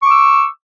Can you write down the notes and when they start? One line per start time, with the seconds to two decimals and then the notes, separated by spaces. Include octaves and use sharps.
0.01 C#6
0.05 D6
0.09 E6